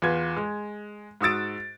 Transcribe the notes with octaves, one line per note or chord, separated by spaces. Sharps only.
E2 F4 B4 G#6
G#3
G#2 F#4 D#6 E6 A6 D7